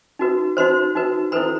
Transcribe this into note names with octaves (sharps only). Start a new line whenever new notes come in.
D#4 F#4 B4
D#4 F#4 B4 C5 C6
D#4 F#4 B4
E4 A4 B4 C5 B5